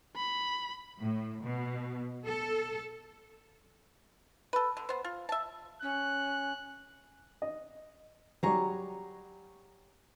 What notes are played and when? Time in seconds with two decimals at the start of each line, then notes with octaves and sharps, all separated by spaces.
0.16 B5
1.00 A2
1.44 B2
2.26 A4
4.53 A4 B4
4.77 D3
4.89 B3 C5
5.05 F4
5.29 E5 A5
5.82 C#4 F#6
7.42 D#5
8.43 F#3 G3 G#4 A#5 C#6